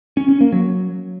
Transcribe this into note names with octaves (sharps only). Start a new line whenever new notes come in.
C#4
C#4
A#3
F#3